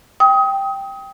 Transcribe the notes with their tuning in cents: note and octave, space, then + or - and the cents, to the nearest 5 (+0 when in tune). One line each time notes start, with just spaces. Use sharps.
G5 +0 D#6 +30